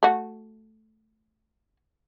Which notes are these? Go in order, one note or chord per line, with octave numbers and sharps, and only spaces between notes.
A3 F#4